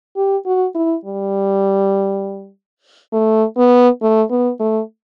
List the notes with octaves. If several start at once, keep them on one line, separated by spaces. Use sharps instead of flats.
G4
F#4
E4
G3
A3
B3
A3
B3
A3